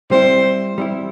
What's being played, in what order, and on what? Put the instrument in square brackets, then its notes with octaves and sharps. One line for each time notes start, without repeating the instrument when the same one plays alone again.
[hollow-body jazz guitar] G3 C4 E4 [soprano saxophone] C5
[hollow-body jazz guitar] G3 C4 E4